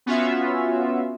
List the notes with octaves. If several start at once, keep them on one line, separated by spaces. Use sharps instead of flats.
B3 C#4 F4 F#4 E5